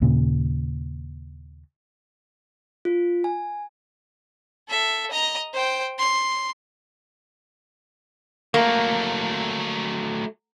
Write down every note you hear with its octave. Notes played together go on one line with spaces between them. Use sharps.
D#2 A#2 C#3
F4
G#5
A4 E5
D#5 A#5
C5 G5
C6
F#3 A3 A#3